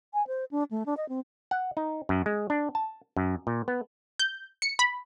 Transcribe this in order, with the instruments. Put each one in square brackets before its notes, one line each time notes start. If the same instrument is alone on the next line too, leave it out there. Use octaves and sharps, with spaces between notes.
[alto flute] G#5
C5
D4
A3
D4
D#5
C4
[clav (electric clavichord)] F#5
D#4
F#2
G#3
D4
A5
F#2
A#2
B3
[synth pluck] G6
C#7
B5